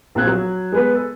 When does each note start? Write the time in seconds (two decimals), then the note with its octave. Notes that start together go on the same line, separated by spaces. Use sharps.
0.15 A#1 F3 C4 F#6 G#6
0.27 F#3
0.72 G#3 B3 B4
0.94 A4